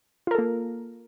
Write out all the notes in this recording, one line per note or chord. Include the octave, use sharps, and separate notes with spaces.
A#3 F4 A4 A#4